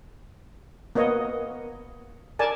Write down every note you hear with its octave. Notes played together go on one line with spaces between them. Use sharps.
A#3 B3 C#5 D#5
A#4 D5 G#5 A5